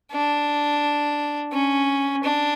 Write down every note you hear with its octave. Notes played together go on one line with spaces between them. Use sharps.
D4
C#4
D4